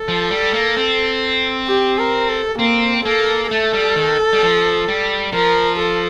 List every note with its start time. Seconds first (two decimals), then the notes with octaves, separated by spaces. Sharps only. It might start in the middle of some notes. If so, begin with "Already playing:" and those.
Already playing: A4
0.08 F3
0.31 G3
0.54 A#3
0.77 C4
1.68 G4
1.98 A#4
2.29 A4
2.59 A#3 C4
3.05 A#3 A4
3.50 A3 A4
3.73 G3
3.96 D#3
4.33 G3
4.42 F3
4.88 G3
5.33 F3 A#4
5.79 A4